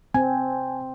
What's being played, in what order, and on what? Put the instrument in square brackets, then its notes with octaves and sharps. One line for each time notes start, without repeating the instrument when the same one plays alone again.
[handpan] C4 [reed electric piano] G#5